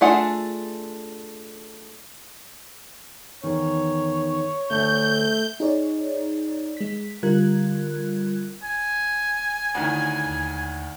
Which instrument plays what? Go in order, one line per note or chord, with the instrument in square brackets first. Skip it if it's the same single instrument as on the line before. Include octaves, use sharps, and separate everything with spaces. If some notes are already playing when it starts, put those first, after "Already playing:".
[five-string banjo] A3 D4 F4 G#4 F#5
[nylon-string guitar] E2 D#3 [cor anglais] C#5
[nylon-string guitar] D2 D3 [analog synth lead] A3 [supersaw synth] G6
[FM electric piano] D#4 G#4 C#5 D5
G#3 B6
D3 G3 F4 A#4 F#6 G#6
[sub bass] D1 [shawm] G#5
[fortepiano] D2 A2 D#3
[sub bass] D#2